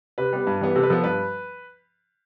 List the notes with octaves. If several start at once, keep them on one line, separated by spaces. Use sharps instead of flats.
C3 B4
G3 B3
G2
E3 G3 B3
C3 A4
B4
F3 B3 A4
G2 B4